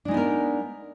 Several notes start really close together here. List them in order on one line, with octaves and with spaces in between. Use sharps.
D4 G#3 D#4 B3 A#4